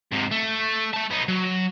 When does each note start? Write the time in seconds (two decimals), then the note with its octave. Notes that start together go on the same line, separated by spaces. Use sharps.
0.13 G#2 C3
0.32 A3
0.93 A3 A5
1.11 B3 D#4
1.28 F#3